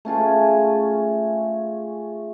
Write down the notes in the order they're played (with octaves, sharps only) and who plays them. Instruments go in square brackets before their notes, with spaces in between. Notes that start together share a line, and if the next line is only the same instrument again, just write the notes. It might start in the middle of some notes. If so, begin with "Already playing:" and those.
[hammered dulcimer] A3 C#4 F4 G#4